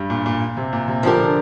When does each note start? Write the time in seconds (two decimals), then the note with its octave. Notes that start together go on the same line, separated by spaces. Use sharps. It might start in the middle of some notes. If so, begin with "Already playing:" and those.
Already playing: G2 G3
0.10 A#2
0.26 A#2
0.57 C3
0.73 A#2
0.88 C3
1.03 D3 F3 D4 G4 A#4
1.19 D3